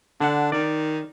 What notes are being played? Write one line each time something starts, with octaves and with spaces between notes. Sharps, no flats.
D3 D4 F#5
D#3 D5